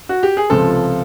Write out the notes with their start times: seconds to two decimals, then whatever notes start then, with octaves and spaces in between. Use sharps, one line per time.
0.09 F#4
0.23 G4
0.37 G#4
0.50 C#2 C3 F3 A4